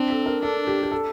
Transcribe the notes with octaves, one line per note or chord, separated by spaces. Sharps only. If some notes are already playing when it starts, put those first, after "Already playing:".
Already playing: C4 D4
A4
A#4
D4 A4
G4
G4
A4